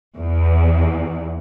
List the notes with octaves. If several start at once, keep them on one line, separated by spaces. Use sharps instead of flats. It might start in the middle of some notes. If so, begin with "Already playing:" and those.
E2